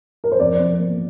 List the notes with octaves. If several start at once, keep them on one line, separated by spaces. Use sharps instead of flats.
A#4
C5
F2 D5
F2
A#3